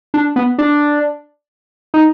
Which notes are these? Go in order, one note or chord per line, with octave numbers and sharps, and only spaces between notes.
D4
B3
D4
D#4